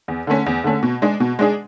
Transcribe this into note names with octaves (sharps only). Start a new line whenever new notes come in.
E2
D3 A3 C#4
E2
D3 A3 C#4
B2
G#3 D4 G#4
B2
G#3 D4 G#4